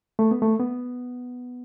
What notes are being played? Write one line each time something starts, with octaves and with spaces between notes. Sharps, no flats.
A3
B3
A3
B3